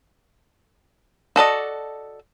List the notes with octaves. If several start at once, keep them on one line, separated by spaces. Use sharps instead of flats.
F#4 A4 D5 D#5